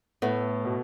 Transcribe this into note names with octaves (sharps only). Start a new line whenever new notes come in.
A2 B3
B2